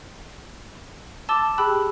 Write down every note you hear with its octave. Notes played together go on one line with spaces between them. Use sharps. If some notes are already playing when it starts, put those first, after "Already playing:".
A5 D6 E6 A6 E7 G7
G4 G#4 G5 B5 E6 F#6